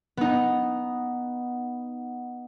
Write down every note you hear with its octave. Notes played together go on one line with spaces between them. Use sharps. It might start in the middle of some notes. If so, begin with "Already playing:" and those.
B3 D#4